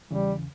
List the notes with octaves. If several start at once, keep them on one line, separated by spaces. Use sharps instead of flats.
E2 C#3 E3 G3